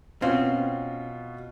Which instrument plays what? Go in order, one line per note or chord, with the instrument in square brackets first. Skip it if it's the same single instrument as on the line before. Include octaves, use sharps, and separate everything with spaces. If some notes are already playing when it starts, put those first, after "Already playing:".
[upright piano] B2 F4 [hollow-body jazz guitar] C4 C#4